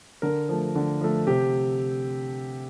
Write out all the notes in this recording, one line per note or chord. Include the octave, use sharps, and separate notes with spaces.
D3 A#4
F3 A3
D3
F3 A3
C3 G4